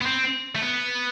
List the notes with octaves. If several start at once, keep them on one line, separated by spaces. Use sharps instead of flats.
B3
C4
A3
B3